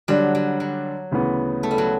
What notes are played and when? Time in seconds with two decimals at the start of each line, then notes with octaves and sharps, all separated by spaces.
0.08 D3 F#3 G3 D4
0.35 F#3
0.60 F#3
1.11 D2 C#3 E3 B3
1.63 A3
1.71 G3
1.78 F#3